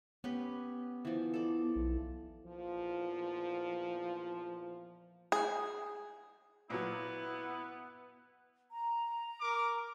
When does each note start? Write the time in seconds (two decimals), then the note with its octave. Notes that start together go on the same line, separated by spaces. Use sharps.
0.24 B3 C#4 G4 B4
1.05 E3 F3
1.34 A4 D5
1.76 B1
2.46 E2 A#2 F3
5.32 G#4
6.70 A#2 F#3 B3 E4
8.71 A#5
9.41 A#4 D6